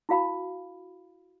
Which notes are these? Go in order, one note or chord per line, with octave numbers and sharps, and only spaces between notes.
E4 F#4 F5 B5